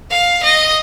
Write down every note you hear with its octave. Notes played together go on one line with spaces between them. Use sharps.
F5
D#5